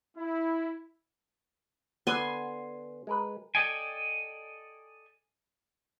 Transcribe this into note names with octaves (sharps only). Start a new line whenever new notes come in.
E4
D3 B3 G#5 C6
G#3 A#4 B4
A4 D5 D#5 G5 G#5